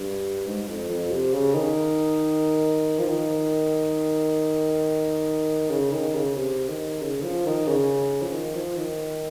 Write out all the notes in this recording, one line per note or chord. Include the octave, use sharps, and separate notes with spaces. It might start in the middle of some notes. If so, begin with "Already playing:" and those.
Already playing: G2
G#2
F2
F2
C3
C#3
D#3
F3
D#3
C#3
D#3
C#3
C3
D#3
C#3
F3
D#3
C#3
F3
D#3
F3
D#3